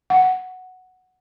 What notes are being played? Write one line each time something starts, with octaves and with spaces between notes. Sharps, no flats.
F#5